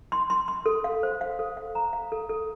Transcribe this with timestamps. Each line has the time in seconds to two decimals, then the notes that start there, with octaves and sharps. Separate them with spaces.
0.12 C6
0.30 C6
0.48 C6
0.66 A4
0.84 F5
1.03 C5
1.21 F5
1.39 A4
1.57 F5
1.75 A#5
1.93 F5
2.12 A4
2.29 A4